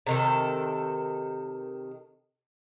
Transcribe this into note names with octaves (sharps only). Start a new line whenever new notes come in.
C3 D#3 A4